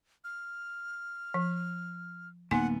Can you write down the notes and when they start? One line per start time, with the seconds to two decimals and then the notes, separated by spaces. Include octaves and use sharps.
0.24 F6
1.34 F3
2.51 D1 A#3 B3 D#4 F#5 G#5